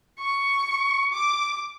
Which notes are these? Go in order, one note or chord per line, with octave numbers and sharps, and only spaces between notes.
C#6
D6